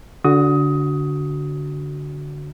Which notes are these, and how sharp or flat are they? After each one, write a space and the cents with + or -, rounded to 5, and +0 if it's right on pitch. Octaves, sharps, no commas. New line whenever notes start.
D3 -20 F#4 +0 D#6 +20